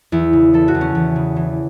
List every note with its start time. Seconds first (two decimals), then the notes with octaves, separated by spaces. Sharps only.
0.12 E2 E4
0.33 C#3
0.53 E3 A4
0.68 F#4
0.75 E2
0.81 C#4
0.95 E2
1.16 C#3
1.36 E3